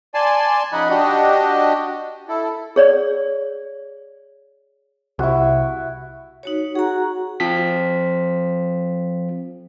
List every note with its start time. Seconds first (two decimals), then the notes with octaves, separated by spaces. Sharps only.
0.14 D5 G#5 A5 C6
0.72 C#3 F3 D#4 D#5 F#5 B5
0.90 D4 F#4 G4 D#5
2.28 E4 A4
2.76 G#4 C#5 D5
5.19 C2 E4 F#4
6.43 D#4 F#4 C#5
6.75 F#4 G#4 A#5
7.40 F3 C4 B6